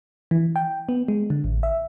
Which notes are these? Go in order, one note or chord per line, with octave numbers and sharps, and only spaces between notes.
E3
G5
B3
G#3
D3
A1
E5